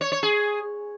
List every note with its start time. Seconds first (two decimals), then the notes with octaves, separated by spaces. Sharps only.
0.01 C#5
0.12 C#5
0.23 G#4